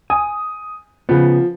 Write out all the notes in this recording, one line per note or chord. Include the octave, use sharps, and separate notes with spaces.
G#5 D#6
C#3 F3 B3